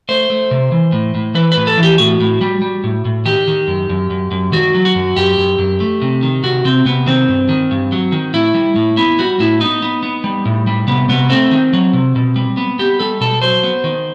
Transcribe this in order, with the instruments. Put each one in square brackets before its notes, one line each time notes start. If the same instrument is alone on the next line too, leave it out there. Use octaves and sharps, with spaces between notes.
[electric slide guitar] A3 C5
A3
C3
E3
A2
A2
E3 B4
B4
A2
A4
E3
G4
A2 F#4
A2
G3
G3
A2
A2
D#3 G4
D#3
F#2
F#2
F#2
F#2
D#3 F#4
F#3
F#4
F#2
F#2 G4
F#2
F#2
A3
C3
D#3
C3 F#4
C3 C4
C3 B3
D#3 C4
G2
D#3
G2
F#3
D#3
A2 E4
G3
A2
B3 E4
G3 F#4
A2 E4
B3 D#4
B3
B3
G3
A2
G3
C3 B3
C3 B3
A3 C4
D#3
F#3
C3
B2
G3
B3
B3 G4
G3 A4
B2 A4
F#3 C5
B3
D#3